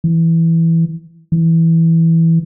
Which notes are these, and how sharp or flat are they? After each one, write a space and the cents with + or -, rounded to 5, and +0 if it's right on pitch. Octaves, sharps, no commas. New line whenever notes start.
E3 +0
E3 -5